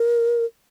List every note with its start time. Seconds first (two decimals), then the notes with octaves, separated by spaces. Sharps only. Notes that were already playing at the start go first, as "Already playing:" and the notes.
Already playing: A#4